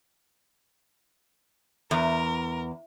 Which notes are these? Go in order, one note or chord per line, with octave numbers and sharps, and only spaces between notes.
E2 A#4